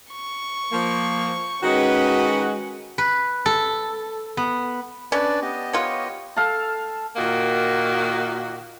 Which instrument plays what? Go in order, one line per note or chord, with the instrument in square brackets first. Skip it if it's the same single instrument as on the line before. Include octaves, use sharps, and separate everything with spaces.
[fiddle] C#6
[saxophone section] F3 A#3
[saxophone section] D#3 G#3 F#4 [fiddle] C#4 B4
[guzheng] B4
A4
B3
[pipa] C#4 [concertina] D4 B4 D5
[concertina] B3 G4 D#5
[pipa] F4 C#5
[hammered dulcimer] A4 F5 G5 A5
[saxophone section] A#2 D#3 A#3 F#4